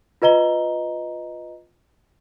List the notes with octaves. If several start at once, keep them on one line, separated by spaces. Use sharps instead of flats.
F4 B4 D#5 A#5 G7